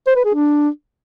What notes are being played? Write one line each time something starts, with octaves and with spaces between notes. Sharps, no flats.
C5
B4
G#4
D4